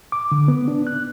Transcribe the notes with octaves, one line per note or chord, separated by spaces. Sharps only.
D6
D3
B3
D4
F#6